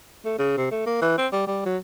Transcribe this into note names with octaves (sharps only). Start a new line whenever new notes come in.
A3
C#3
C3
A3
A#3
E3
C4
G3
G3
F#3